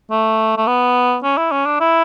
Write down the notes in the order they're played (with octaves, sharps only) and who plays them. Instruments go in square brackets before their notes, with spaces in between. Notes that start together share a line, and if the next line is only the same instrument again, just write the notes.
[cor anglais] A3
A3
B3
C#4
E4
C#4
D4
E4